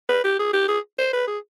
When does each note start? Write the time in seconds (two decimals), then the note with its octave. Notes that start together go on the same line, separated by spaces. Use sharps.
0.09 B4
0.24 G4
0.39 G#4
0.53 G4
0.68 G#4
0.99 C5
1.13 B4
1.28 G#4